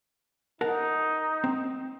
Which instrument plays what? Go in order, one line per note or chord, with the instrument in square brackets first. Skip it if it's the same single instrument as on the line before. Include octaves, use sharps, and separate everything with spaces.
[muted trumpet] D#4 [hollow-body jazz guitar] A#4 F#5 A5
[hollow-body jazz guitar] C4